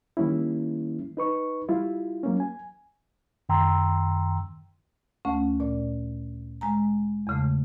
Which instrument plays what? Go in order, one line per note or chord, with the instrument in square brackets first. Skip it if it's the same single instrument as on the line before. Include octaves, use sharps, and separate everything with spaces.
[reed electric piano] D#3 G3 A#3 C#4 E4
D#4 B4 C#6
G3 E4 F4
F#3 A#3 C#4
G#5
[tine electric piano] F#2 D#3 G5 A#5 C6 E6
[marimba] D2 A3 C#4
A#2 D5
G#3 G#5 A#5
E2 C#3 A3